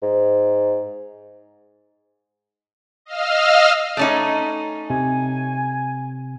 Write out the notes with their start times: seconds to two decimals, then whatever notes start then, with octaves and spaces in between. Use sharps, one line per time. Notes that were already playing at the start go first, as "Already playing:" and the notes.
0.03 G#2
3.05 D#5 F5 E6 F6
3.97 A3 C#4 D#4
4.90 C3 G#5